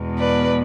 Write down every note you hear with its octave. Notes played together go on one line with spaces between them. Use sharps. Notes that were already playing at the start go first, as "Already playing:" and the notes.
Already playing: E2 B2 G#3
B4 D5